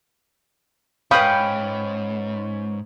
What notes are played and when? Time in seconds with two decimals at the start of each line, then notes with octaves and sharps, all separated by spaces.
1.11 G#2 C#4 B4 F5 G5 B5 D#6